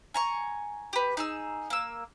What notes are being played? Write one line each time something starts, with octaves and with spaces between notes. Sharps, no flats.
G#5 A#5 C#6
G4 B4
D#4 G#4 E6
A#3 E6